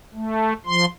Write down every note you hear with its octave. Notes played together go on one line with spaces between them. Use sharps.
A3
F3 C6